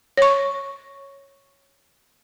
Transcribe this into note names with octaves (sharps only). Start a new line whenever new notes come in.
C#5 C#6